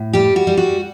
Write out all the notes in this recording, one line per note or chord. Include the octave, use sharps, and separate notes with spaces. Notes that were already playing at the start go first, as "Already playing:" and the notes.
Already playing: A2
G3 G4
F#4
G3
F#4